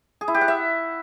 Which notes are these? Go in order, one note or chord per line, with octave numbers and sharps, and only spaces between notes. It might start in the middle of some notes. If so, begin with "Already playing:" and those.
G#4
E4
G4
F#5
E5